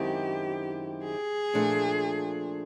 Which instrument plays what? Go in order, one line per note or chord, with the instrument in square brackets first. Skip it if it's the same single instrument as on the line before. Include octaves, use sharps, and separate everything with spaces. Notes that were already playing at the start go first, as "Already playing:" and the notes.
Already playing: [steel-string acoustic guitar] F#2 D#3 G#3 C4 E4 [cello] G4
[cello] G#4
[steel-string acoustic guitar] A#2 F3 A3 D4